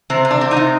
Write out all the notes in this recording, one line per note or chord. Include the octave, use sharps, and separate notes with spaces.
C3 C4
C3
D4
C4
D#4
C3